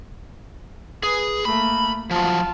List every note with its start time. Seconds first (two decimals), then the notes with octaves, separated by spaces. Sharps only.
1.03 G#4 B4
1.45 A3 A#3 B5
2.11 F3 F#3 F4 A5